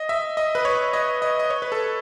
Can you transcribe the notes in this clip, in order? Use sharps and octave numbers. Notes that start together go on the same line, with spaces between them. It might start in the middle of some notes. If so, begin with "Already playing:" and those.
Already playing: D#5
E5
D#5
B4
C#5
D#5
D#5
D#5
C#5
B4
A4